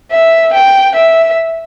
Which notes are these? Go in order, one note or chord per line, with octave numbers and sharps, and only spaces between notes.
E5
G5
E5